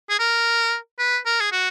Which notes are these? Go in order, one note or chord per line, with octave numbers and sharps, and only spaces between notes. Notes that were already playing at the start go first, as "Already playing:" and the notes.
G#4
A#4
B4
A#4
G#4
F#4